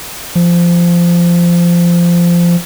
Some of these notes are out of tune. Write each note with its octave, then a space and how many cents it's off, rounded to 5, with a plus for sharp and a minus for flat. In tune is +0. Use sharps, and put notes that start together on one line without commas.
F3 -15